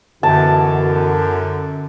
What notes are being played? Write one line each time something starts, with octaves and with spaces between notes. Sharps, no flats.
F#2 B2 D3 E3 F#4 A5